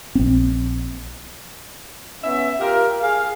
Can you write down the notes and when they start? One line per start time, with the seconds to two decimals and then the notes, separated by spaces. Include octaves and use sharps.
0.15 A#1 C4
2.23 B3 C#4 E5
2.59 F4 G4 A#4
3.01 G#4 F5